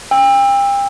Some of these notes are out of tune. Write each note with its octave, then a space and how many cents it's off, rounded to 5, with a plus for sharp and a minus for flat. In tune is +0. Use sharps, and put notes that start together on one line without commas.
G5 +35 E6 +0